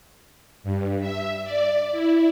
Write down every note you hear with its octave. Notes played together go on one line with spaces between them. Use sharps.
G2
E5
D5
E4